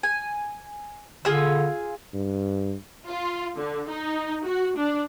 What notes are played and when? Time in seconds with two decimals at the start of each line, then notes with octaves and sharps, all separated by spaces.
0.03 G#5
1.25 D3 F4 G#4 E6
2.14 G2
3.06 F4
3.56 D3
3.89 D#4
4.44 F#4
4.76 D4